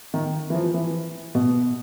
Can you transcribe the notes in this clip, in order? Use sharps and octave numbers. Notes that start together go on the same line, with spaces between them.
D#3
E3
F3
E3
B2